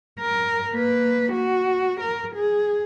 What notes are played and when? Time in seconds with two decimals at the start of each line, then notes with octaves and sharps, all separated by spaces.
0.20 A#4
0.72 A#3 B4
1.33 F#4
2.00 A#4
2.35 G#4